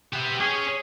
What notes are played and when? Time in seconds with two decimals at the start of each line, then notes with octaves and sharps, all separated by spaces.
0.13 B3 G4 E5
0.40 C#4 G#4